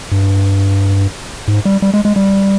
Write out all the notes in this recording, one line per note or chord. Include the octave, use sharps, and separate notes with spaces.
G2
G#2
G3
G3
G#3
G#3
G3